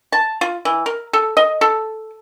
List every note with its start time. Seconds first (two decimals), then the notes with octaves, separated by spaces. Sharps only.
0.12 A5
0.41 F4
0.65 E3
0.86 A#4
1.13 A4
1.37 D#5
1.61 A4